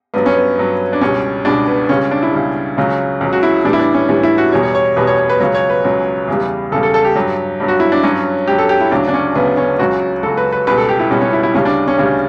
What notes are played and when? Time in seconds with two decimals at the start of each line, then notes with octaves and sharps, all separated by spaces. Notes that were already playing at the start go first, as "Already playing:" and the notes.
0.14 G2 F#3 B3
0.26 C#4
0.36 B3
0.58 G2 F#3
0.93 D4
1.01 C#2 B2 G3 C#4
1.45 C#2 B2 G3 D4
1.67 B3
1.89 C#2 C#3 G3 C#4
2.11 D4
2.23 E4
2.33 C#2 C#3 G3
2.77 C#2 C#3 F#3
3.21 C#2 C#3 F#3
3.33 F#4
3.43 E4
3.65 A2 E3 G3 D4
3.73 E4
3.79 D4
3.94 C#4
4.09 A2 E3 G3 C#4
4.23 E4
4.38 F#4
4.52 E2 B2 G3 C#5
4.63 C#5
4.75 C#5
4.96 E2 B2 G3 B4
5.07 C#5
5.18 C#5
5.30 B4
5.40 C#2 C#3 F#3 C#5
5.55 C#5
5.70 B4
5.84 C#2 C#3 F#3
6.28 E2 C#3 G3
6.72 E2 C#3 G3 A4
6.83 A4
6.94 A4
7.05 G4
7.16 G2 F#3
7.60 G2 F#3
7.68 F#4
7.80 E4
7.92 D4
8.03 G2 F#3 C#4
8.47 G2 F#3 G4
8.58 A4
8.69 G4
8.81 E4
8.91 D2 C#3 F#3 D4
9.08 D4
9.14 C#4
9.35 D2 C#3 F#3 B3
9.57 C#4
9.79 C#2 C#3 F#3 F#4
10.23 C#2 C#3 F#3 A4
10.37 B4
10.52 B4
10.67 C#2 B2 G3 B4
10.78 A4
10.89 G4
11.00 E4
11.11 C#2 B2 G3 C#4
11.21 C#4
11.33 E4
11.43 E4
11.54 D2 C#3 G3 C#4
11.65 D4
11.88 C#4
11.98 D2 C#3 G3 C#4